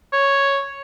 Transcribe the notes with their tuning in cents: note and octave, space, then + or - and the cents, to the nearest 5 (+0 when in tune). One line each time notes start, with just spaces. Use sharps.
C#5 +0